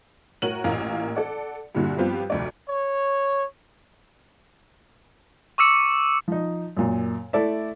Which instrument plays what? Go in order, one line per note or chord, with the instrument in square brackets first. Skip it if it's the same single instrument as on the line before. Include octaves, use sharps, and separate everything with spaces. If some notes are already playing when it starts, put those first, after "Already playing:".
[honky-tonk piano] A2 F#4 A#4 C#5 D#7 F#7
A1 A#2 E3 A#3 F5 A#5
A4 D5 F#5
G2 A#2 D3 E4 F#4
G2 F3 B3 C4 F4 G4
F1 D2 D5
[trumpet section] C#5
[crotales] C#6 D6 E6 C#7
[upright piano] F3 D#4
F#2 A#2
A3 E4 A4 D5 E5